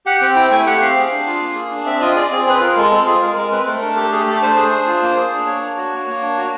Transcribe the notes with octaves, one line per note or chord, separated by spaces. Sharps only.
G4 F#5
C4 G5
E4 G5
A3 G#5
G4 F#5
C4 F5
G#4
D4
F4
A#3
G#4
D4
C4 E5
F4 D#5
G#4 D5
C4 G#4
C4 B4
F4 A#4
G#3 A4
C4 A4
F4 G#4
G#3 A#4
G#3 A#4
C4 B4
A3 A#4
D4 A#4
G4 A4
A3 G#4
A3 A4
D4 C5
G#4
D4
F4
A#3
G#4
D4
A#3 C#5
D4
F#4
A#3
A#3
D4
F#4